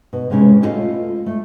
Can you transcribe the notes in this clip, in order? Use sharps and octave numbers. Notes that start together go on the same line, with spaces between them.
B2
A2 C3 G#3 C#4 E4
A3 B3 E4 F4 D#5 F5
A3